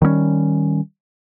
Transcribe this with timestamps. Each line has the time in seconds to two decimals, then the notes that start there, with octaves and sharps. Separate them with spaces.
0.02 D#3 G3 A3 C#4